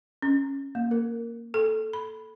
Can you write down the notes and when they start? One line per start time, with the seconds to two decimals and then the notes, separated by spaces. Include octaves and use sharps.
0.22 C#4
0.75 A#3
0.91 A#4
1.54 A4
1.93 B5